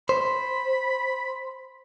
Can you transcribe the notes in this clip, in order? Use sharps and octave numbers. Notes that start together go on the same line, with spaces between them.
C5 B5